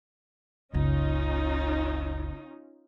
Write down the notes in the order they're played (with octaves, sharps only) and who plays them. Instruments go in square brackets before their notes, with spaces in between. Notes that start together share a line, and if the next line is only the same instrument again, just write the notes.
[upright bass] F#1 C#2 [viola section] C#4 D#4 F4